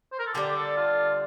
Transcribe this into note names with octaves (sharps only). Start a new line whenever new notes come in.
C5
A#4
A4
D3 G3 D4 G4
A4
F4